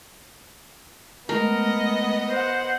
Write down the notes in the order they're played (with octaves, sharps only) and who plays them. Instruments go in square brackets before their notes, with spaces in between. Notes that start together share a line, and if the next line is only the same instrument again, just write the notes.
[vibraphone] G#3 A3 [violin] B3 D#5 [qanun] A#4
[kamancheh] C5 F#5